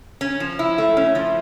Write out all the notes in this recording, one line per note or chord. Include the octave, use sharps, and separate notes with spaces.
C#4
F3
E4
A3
C#4
F3